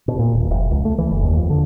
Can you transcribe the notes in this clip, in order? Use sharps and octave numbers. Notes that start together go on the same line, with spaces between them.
B2
A#2
D#1
F1
C#2
A3
E3
F#1
D#2
F2
D3